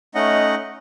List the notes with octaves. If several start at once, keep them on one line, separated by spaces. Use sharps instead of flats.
A3 C#4 D#4 D#5 F#5